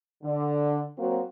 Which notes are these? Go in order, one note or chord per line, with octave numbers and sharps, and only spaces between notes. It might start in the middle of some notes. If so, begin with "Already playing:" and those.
D3
F#3 A#3 C4 F#4